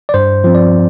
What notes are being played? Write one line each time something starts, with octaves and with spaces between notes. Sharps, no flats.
D5
G2 C5
F3 C4
D5